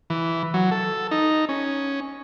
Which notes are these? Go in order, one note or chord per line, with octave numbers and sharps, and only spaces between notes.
E3
F#3
A4
D#4
C#4